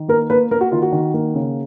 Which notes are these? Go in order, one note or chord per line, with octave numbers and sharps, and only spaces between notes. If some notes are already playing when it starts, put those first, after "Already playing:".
Already playing: D#3
A#3 A#4
A#3 B4
A#3 A#4
F#4
D#3 F4
F#4
D#3
A#3
C#3